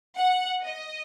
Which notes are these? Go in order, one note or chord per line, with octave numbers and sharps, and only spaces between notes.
F#5
D#5